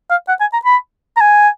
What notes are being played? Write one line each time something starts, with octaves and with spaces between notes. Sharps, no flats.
F5
F#5
G#5
A#5
B5
A#5
G#5